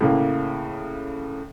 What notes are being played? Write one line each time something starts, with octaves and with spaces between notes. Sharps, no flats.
A2 C#3 A#3